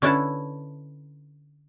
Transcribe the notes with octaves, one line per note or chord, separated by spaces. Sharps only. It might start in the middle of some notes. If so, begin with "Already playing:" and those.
D3 C#4 E4 A4 B4 A5